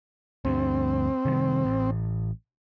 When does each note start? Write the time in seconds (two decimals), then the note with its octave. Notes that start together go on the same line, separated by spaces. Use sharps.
0.45 D2 G2 C4
1.25 C3 D#3 G3
1.65 A1